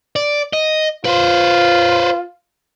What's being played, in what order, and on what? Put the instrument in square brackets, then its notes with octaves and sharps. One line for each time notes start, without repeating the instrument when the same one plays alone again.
[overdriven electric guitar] D5
D#5
[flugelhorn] F4 [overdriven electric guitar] B4 C5